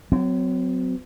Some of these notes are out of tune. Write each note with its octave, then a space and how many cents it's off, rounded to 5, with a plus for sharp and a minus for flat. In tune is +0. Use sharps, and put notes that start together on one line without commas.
F#3 +0 C4 -40